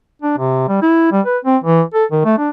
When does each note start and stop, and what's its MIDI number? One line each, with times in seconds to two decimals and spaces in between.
0.22 0.36 62
0.38 0.66 48
0.69 0.78 55
0.82 1.07 64
1.12 1.21 55
1.26 1.38 71
1.45 1.58 60
1.64 1.82 52
1.94 2.05 69
2.11 2.22 51
2.25 2.36 57
2.38 2.50 62